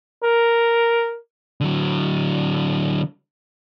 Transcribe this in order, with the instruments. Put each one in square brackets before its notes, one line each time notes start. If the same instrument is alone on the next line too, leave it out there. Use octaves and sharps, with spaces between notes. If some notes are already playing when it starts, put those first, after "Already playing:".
[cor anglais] A#4
[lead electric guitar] D3 F#3